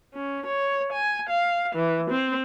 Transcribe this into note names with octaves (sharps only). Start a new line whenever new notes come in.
C#4
C#5
G#5
F5
E3
C4